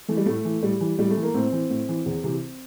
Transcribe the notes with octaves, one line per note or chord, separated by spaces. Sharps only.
E3 A3
G3
A2 A3
E3
A2 G3
E3
A2 G3
A3
E3
A#3
A2 C4
E3
A2
E3
E2
C3 E3